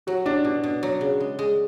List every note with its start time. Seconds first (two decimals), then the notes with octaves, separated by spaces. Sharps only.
0.07 F#3 F#4
0.26 C#4 D4
0.45 B2 D4
0.63 B2
0.83 F#3
1.01 C#3
1.20 G#3
1.39 G#3